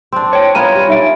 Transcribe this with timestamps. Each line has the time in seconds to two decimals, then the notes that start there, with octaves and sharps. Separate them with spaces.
0.13 C4 D4
0.33 C#5 G5
0.55 A#3 B3 F4 C#5 G#5 A#5 G#6 D#7
0.75 G3
0.88 D#4 E5 D7